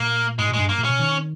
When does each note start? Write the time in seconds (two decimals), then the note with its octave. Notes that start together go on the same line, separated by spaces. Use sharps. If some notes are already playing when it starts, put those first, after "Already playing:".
Already playing: A#2 A#3
0.39 G#2 G#3
0.49 A#2 G#3
0.59 G2
0.69 A#3
0.79 A#2
0.84 C#4
0.89 B2
0.99 D#3